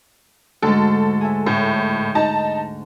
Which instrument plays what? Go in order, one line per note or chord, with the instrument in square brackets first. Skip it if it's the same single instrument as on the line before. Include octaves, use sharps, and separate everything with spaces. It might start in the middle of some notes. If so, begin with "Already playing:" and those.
[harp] D2 G#2 [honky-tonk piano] A4
[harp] G#4 E5
[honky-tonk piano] A2
D#4 A5